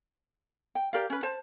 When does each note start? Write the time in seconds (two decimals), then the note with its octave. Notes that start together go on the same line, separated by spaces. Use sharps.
0.75 G5
0.93 G4 A#4 D5 F5
1.10 C#4 B4
1.23 C5 A5